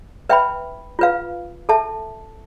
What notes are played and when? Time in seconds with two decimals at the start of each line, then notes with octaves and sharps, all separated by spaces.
0.29 B4 E5 G5 B5
0.99 F4 B4 F5
1.69 A4 E5 A5